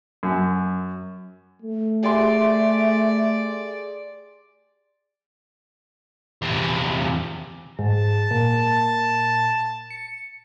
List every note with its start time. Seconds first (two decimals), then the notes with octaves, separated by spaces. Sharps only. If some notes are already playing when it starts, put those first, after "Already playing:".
0.23 F#2
1.63 A3
2.03 G4 G#4 D5 E5 C6
6.42 E2 C3
7.79 G#2 A5
8.31 A#2
9.91 C#7